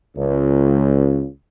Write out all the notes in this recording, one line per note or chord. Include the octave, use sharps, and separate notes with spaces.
C#2